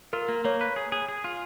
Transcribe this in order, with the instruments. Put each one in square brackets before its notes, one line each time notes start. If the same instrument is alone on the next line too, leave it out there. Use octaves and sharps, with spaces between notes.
[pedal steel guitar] F4 [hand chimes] A#4
[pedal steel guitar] A#3
[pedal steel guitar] A#3 [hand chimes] C#5
[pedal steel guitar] B4
G#4
G#4
G#4
F4